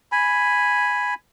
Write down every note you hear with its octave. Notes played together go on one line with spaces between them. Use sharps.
G#5 B5